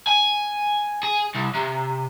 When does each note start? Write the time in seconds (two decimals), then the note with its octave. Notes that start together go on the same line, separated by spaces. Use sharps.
0.07 G#5
1.03 G#4
1.34 C2
1.54 C3